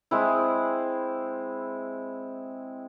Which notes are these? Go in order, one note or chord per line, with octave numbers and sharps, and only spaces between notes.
G#3 C4 E4